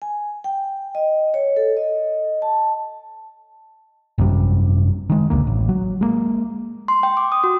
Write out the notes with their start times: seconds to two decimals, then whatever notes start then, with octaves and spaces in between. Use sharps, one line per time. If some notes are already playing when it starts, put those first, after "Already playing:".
0.02 G#5
0.44 G5
0.95 D#5
1.34 C#5
1.56 A4
1.77 D#5
2.42 A5
4.18 G#1 F#2 C3 G3
5.09 D#3 G#3
5.30 D#1 C#2 D3 A#3
5.47 A1
5.69 F#3
6.01 G#3 A#3
6.88 C6
7.03 G5
7.17 D6
7.32 D#6
7.44 F#4